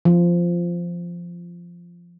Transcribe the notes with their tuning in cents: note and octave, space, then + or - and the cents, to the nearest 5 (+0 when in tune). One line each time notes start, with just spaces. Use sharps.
F3 -10